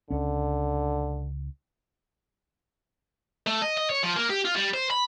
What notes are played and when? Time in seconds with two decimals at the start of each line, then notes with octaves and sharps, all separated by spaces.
0.11 C#2 D3 C#4
3.47 A3
3.62 D#5
3.77 D#5
3.90 C#5
4.03 F3
4.16 A#3
4.30 G4
4.45 F4
4.56 G3
4.74 C5
4.91 B5